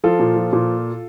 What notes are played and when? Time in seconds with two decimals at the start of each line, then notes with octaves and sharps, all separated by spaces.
0.04 F3 F4 A4
0.19 A#2
0.36 F3
0.53 A#2